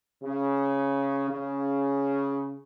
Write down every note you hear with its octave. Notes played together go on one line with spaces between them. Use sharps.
C#3
C#3